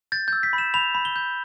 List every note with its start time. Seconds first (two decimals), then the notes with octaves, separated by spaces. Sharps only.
0.12 G6 A6
0.28 E6 G6
0.43 B6
0.53 B5
0.58 E7
0.74 B5 F7
0.95 B5
1.05 G7
1.16 G6